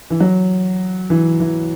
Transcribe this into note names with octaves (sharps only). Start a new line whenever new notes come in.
E3
F#3
E3
E3